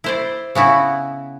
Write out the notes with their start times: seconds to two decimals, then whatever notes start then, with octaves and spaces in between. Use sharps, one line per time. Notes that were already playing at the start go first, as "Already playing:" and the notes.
0.04 E4 C5 D5
0.55 C#3 B3 E4 F#4